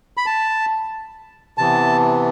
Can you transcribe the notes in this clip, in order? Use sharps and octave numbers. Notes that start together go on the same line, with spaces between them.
B5
A5
C3 E3 B3 A5